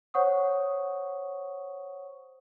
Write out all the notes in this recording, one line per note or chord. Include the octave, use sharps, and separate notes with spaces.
C5 C#5 F#5 C#6 D#6